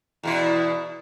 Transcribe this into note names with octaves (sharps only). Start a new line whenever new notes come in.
E2 B2 E4